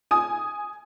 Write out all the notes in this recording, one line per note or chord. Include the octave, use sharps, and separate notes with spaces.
G#5 D#6